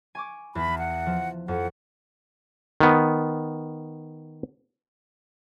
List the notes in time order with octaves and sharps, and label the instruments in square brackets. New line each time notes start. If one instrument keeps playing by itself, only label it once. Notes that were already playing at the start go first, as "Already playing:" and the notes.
[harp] G#5 C#6 D6
[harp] E2 [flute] B5
[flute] F#5
[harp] F3
[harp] F2 [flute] F#5
[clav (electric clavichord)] D#3 B3